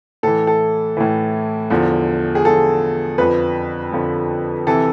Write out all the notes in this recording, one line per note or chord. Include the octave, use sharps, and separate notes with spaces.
A2 E3 A4
A4
A2 E3
E2 D3 F3
G#4
E2 D3 F3 A4
F2 D3 F3 B4
F2 D3 F3
C3 E3 A4